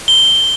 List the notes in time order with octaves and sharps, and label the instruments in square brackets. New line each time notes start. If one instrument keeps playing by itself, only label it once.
[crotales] G7